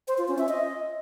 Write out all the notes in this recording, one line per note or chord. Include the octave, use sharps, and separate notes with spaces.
C5
F4
C#4
E5
D#5